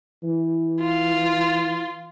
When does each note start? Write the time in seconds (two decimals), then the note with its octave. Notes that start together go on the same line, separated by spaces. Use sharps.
0.23 E3
0.80 F4